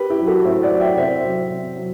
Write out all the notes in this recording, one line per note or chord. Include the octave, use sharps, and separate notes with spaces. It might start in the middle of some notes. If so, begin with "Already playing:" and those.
Already playing: G4 B4
E4 G4
F#3
F#4 A4
A2 C5 E5
D5 F#5
F#3
E5 G5
C3 C5 E5
F#3
C3
F#3